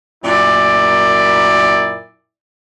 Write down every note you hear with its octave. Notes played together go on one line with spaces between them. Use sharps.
F#2 A#2 E4 D5